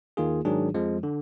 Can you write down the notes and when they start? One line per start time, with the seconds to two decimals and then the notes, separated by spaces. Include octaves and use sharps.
0.17 D#2 D#3 A#3 F4 G#4
0.45 G#2 D#3 F#3 D4 G#4
0.74 F2 F3 G#3
1.03 D3